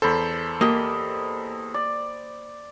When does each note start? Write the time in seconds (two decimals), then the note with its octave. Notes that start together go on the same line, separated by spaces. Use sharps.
0.02 E2 A4 C5 B5
0.61 A#3 G4 D#5
1.74 D5